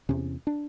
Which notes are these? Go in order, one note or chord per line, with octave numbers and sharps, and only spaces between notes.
E2 C3 C#4
D4